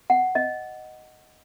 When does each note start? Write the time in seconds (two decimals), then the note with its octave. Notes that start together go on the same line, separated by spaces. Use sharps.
0.10 F#5
0.35 D#5